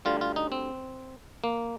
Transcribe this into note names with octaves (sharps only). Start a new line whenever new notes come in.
D2 D3 G3 F4
F4
D#4
C4
A#3